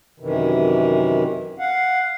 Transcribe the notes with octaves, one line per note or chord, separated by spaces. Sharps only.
F#2 C3 D#3 E3
F5 F#5